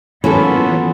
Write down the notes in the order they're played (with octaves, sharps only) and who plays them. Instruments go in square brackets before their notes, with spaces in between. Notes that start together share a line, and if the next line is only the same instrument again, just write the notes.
[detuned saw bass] E3 [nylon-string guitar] F#3 A#3 C#4 [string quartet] B3 [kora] E4 F4 A4